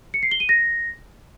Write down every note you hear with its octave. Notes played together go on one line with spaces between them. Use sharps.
C#7
C7
G7
D#7
A#6